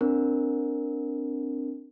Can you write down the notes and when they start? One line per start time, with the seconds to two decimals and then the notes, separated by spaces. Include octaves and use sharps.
0.01 C4 D4 A#4